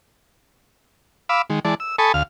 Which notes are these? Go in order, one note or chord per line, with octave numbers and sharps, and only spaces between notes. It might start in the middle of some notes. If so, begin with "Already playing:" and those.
F5 B5 D6 E6
D#3 G#3
E3 G#3 D5 A5
E6
A4 G#5 A5 B5 C#6 D#6
D2 F5 F6